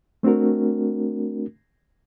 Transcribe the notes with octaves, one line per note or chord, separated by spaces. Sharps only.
A3 C4 D4 F#4 A#4